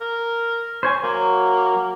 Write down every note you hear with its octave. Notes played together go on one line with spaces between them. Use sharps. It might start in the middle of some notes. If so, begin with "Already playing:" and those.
A#4
C5 C#5 G#5
F#3 A#3